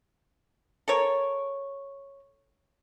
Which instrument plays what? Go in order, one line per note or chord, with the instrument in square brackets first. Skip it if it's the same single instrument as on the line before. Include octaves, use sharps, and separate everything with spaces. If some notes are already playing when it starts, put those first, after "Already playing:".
[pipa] A4 A#4 C#5